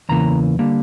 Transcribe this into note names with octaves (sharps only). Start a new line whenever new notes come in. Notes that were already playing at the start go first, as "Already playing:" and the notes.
E2 C#3 E3 A#3 A#5
D3 G3 A#3